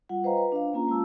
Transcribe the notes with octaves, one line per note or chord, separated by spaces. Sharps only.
G3 F4 F#5
B4 C5 D#5 F5 G5 A#5
B4
D4 F5
A#3 C#4 F4 A#5
G#3 F4 A5 E6